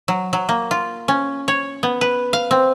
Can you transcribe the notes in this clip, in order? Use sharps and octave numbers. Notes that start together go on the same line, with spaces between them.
F#3
F#3
A#3
F4
C#4
C#5
B3
B4
F5
C4